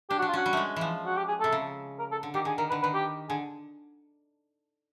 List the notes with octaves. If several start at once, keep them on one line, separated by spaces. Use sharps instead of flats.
D4 G4
F#4
D4
F4
C#4 F#4
G3
G#3 A3
E3 F3
F#4
G4
G#4
C3 A4
C#3
A#4
A4
D3
D#3 G4
D3 G#4
D#3 A#4
D3 B4
D#3 B4
G4
D3 G#4